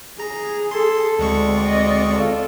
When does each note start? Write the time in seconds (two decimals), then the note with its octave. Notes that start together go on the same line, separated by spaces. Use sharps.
0.20 G#4 A#5
0.71 A4 C6
1.19 D2 G#3 C4 D5 C#6
1.66 D#5
2.15 F4 A4